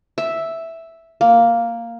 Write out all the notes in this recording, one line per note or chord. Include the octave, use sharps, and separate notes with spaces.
E5
A#3